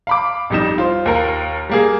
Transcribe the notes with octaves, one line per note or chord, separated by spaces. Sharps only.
F5 B5 D6
A1 F2 G3 D#4 E7
F4 C5
D#2 A#4 F5
G3 A#3 G#4